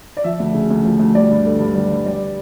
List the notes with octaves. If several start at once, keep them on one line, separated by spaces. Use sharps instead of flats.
D5
F3 E5
D2
C#3
D2
F3
D2
G3 D5
G2
D3
G2
G3
G2
G3 D5